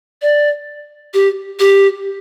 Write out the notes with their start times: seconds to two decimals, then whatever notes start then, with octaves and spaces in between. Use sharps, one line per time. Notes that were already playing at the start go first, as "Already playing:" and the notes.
0.22 D5
1.14 G4
1.60 G4